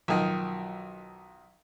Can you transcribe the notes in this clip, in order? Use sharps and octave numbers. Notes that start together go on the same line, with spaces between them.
B1 D#3 F3